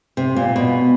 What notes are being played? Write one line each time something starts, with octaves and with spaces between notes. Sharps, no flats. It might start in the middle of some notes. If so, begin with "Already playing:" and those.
C3
A#2
B2